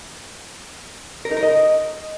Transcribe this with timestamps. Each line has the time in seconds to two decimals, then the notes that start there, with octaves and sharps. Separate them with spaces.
1.25 A#4
1.31 D#4
1.37 A#4
1.43 D#5